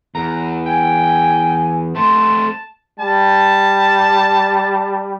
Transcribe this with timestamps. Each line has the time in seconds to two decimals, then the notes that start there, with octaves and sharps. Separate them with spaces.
0.15 E2 A#5
0.66 G5 G#5
1.96 A3 C4 A5 C6
2.99 G3 A5